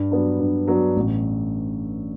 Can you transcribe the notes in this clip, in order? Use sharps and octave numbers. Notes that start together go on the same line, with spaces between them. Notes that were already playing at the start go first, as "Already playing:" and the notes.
Already playing: G2
F#3 B3 D4
G2
F#3 B3 D4
A1